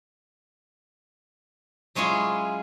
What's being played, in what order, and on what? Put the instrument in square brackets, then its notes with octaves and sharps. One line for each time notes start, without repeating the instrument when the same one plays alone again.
[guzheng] F#3 G#3 C#4 E4 F4 G#4